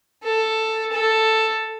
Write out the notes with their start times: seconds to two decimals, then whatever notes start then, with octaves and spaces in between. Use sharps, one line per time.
0.24 A4
0.92 A4